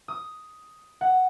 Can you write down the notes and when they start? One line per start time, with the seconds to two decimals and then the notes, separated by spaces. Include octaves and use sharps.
0.08 D#6
1.01 F#5